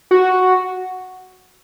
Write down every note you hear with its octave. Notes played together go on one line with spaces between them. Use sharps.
F#4